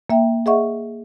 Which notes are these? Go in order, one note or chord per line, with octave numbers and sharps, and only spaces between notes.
A#3 E5 G5
G#4 D#5 E5 F#5 C#6